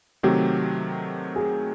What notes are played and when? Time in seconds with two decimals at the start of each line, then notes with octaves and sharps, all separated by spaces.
0.23 C3 D#3 F#3 A3 C4 G4
1.36 G#4